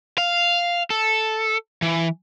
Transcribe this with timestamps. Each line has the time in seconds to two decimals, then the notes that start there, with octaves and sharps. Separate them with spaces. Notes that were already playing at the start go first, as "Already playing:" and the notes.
0.18 F5
0.90 A4
1.82 E3